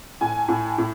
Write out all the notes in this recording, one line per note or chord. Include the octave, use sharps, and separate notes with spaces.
A2 G#5
A2
A2